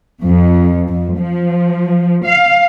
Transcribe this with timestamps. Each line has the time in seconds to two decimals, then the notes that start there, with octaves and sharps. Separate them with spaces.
0.23 F2
0.89 F2
1.19 F3
2.25 F5